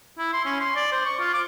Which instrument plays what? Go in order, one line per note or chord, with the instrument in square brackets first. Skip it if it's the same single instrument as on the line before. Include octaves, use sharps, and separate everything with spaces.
[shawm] E4
C6
C#4
C6
D5
C5
C#6
F4
D6